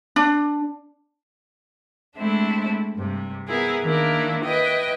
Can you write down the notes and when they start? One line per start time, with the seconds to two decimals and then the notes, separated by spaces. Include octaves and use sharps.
0.16 D4
2.16 G#3 A3 C4 D4 E4
2.95 G2 C3
3.48 B3 E4 G#4 A#4
3.83 D#3 A#3 D4 E4 A#4
4.44 E4 B4 D#5 G5